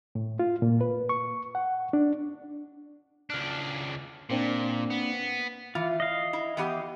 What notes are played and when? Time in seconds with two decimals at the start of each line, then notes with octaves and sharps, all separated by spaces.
0.15 A2
0.39 F4
0.62 A#2
0.81 B4
1.09 C#6
1.55 F#5
1.93 D4
3.30 C#2 D4 F6 F#6
4.30 A#2 A#3 C4 D4
4.90 B3
5.75 E3 F4
6.00 D#5 F5
6.33 E4
6.57 E3 B3 G4